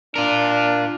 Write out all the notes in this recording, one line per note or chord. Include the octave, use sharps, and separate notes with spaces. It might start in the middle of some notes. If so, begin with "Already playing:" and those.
D4 F4 A#4